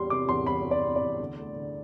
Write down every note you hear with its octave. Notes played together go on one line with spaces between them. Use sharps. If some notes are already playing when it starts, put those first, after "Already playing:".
Already playing: E2 G3 C6
C3 D6
E2 C6
E2 B5
G3
D5
C3
D5
E2
D2
A3
D3